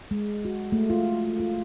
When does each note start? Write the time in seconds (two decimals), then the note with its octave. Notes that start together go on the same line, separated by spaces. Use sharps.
0.11 G#3
0.45 F#4
0.72 A3
0.90 F4
1.40 F4